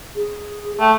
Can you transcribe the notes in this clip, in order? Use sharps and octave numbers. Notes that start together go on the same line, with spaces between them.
G#4
A3 G5